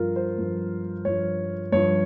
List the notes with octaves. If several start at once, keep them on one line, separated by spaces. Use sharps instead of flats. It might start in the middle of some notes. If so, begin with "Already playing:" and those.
Already playing: G2 F3 F4 A#4
C5
G2 F3
G2 F3 C#5
G2 F3 C#5